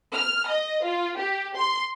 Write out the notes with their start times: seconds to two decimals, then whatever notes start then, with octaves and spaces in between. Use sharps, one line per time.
0.13 F6
0.47 D#5
0.84 F4
1.17 G4
1.56 C6